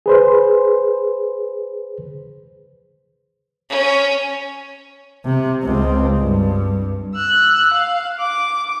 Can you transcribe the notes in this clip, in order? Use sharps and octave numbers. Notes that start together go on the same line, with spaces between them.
G#4 B4 C5
C#4
C3
C#2 C4
G2
E6 F#6
F5
D6